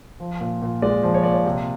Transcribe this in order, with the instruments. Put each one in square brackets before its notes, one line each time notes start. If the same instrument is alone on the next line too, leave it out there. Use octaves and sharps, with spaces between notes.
[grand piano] F3
A#2
A#2
G#3 D5
F3
C#5
A#2 D5
C#5
C3